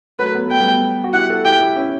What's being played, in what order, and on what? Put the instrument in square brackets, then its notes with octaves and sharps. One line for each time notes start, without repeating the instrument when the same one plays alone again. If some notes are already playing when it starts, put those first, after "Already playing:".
[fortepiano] F#3 A3 [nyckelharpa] B4
[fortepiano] B3
[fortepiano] A3 [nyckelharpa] G5
[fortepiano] G3 B3
F#4
[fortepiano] E4 G4 [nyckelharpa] F#5
[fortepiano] F#4 A4
[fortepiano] E4 G4 [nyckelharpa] G5
[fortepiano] E4 G4
C#4 E4